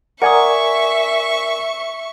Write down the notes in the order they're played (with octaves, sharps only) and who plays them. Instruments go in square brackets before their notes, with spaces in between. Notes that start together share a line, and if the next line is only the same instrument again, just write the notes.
[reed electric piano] A#4 D5 G#5 [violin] E5 C#6 [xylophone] F#5 A#5 D#6